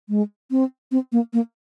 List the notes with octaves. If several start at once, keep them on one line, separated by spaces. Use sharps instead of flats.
G#3
C4
C4
A#3
A#3